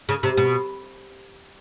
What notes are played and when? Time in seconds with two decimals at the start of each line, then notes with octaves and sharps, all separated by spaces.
0.09 C#3
0.23 C3
0.37 B2